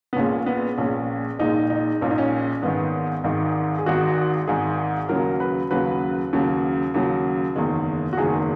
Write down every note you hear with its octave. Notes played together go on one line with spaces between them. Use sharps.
B3
A#1 A#2 G#3 C#4
B3
A#1 A#2 G#3 C#4
A#1 A#2 G#3 D#4
D#4
A#1 A#2 G#3 C#4
D#4
C#4
G#1 G#2 D#3 B3
G#1 G#2 D#3
G#4
G#1 G#2 D#3 F#4
G#1 G#2 D#3 G#4
D#2 C#3 F#3 A#4
B4
D#2 C#3 F#3 B4
D#2 C#3 F#3
D#2 C#3 F#3
F#1 E2 D#3 G#3
F#4
F#1 E2 D#3 G#3 G#4